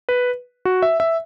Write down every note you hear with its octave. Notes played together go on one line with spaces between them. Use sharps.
B4
F#4
E5
E5